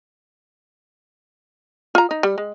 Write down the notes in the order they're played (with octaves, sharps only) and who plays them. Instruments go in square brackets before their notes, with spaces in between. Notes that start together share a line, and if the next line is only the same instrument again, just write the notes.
[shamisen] F4 A#5
D#4
G3
G#3